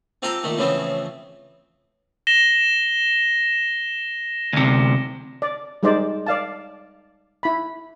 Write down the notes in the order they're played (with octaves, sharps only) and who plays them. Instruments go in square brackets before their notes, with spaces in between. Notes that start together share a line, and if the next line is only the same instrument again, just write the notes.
[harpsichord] C4 F4 G4 A4 G5 A#5
A#2 D#3 A3
A2 C#3 E3 F3 B3 C4
[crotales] A#6 E7 G7
[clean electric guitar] D2 C3
[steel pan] D5
G3 G#3 D#4 C5 D5
D5 F5 A5
E4 B5